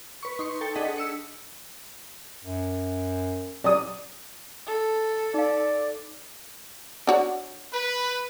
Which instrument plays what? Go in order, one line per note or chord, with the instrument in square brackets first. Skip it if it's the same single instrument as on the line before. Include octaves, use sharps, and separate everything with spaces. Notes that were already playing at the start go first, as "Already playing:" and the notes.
[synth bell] B4 C#6
D#4 C6 C#6
A4 G5 A5 C#7
D4 G#4 D#5 F#5 B6
E6 C#7
[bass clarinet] F#2
[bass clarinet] F#3 [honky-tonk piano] D5 D#6
[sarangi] A4
[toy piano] D#4 F5 [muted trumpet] D5
[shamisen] D4 F#4 C#5
[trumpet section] B4